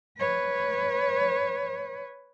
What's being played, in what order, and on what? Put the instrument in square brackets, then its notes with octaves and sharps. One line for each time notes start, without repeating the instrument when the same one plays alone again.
[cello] B4 C#5